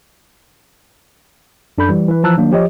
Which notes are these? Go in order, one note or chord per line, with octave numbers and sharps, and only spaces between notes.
F#2 D4 A4 B5 G6
E3 G3
E3 B4
E3 F3 A5 A#5 E6 F#6
D#3 F#3 A#3 D4
F3 G4 C#5 D#5